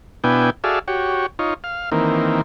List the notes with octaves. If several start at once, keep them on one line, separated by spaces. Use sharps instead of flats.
B2 B3 D4 E4 G5 G#5
F#4 G#4 A4 D5 E5 F5
F#4 G4 C#5
D#4 F4 C#5
F5
D#3 E3 A#3 C4